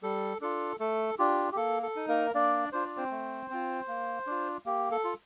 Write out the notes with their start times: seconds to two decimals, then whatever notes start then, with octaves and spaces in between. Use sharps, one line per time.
0.03 G3 A4
0.41 D4 F4 A4
0.80 A3 A4
1.19 D4 F4 G4
1.52 G4
1.56 A#3 A4
1.82 A4
1.96 D#4
2.08 A#3 A#4
2.34 A#3 D4 D5
2.72 D4 F4 C5
2.85 D5
2.97 C4 C5
3.11 A3
3.50 C4 F4
3.88 A#3
4.27 D4 F4
4.66 A#3 G4
4.91 A4
5.04 F4